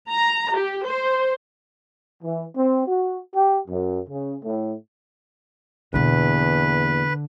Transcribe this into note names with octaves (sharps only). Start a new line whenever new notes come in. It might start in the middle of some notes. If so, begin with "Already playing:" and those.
A#5
G4
C5
E3
C4
F#4
G4
F#2
C#3
A2
E2 B2 D3 A#3 B4